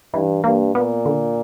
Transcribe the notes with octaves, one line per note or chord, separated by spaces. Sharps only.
G2 E3
G2 A#3
A#2 B3
D3